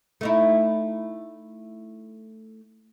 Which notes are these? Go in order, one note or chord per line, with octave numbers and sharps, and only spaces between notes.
A3 D#4 E4